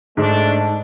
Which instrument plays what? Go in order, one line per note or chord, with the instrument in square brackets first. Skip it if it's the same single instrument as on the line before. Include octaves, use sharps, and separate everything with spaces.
[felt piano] G#2 [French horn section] A3 D4